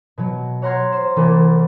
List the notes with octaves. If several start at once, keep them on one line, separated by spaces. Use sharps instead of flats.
B2 F#3
C#5 F#5 A#5 C6 F6 G#6
C5
C2 E3 A3 A#3